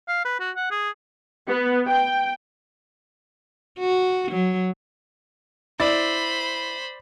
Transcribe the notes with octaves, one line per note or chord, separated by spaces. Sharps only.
F5
B4
F#4
F#5
G#4
B3
G5
F#4
F#3
E4 C5 D5 B5 A6